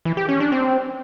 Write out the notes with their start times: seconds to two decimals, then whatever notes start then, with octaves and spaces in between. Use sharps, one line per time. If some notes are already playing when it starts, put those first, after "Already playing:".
0.05 E3
0.17 G4
0.29 C#4
0.40 D4
0.52 C4